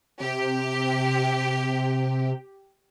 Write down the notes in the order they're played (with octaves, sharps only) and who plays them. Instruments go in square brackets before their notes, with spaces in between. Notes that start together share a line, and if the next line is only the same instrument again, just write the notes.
[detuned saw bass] C3 [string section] G4